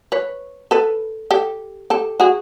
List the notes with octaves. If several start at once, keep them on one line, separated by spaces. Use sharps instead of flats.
B4 C#5
A4 B4
G4 A4
G4 A4
F#4 G#4